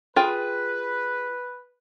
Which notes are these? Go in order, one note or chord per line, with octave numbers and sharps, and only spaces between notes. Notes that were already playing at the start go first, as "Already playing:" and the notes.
F4 G#4 B4 G5